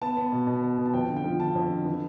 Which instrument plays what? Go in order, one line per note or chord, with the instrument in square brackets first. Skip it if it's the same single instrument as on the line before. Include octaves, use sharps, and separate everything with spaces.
[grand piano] B3 A5
B3
B2
B2
B3
B2
A5
F2 G5
D3
G5
F3
D3 A5
F2
D3
E3